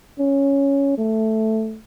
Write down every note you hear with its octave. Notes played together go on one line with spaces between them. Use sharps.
C#4
A3